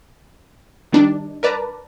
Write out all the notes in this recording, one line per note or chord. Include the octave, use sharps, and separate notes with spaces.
D#3 G3 D4 D#4
A#4 B4 D5 A5 A#5